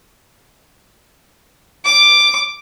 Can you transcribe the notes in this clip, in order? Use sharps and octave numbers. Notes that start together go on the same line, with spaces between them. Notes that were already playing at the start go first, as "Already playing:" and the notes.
D6